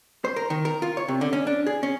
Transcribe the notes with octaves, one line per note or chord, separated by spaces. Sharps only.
C5
A#4
D#3
A#4
F4
C#5
C3
D3
C#4
D4
G#4
C#4